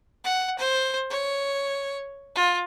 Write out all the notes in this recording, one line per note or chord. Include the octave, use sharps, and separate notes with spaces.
F#5
C5
C#5
F4